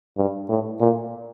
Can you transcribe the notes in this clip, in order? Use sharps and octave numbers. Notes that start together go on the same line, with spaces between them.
G2
A2
A#2